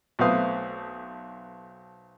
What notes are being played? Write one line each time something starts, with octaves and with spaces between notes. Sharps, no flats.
B1 A3 C4 B4 F5 D#6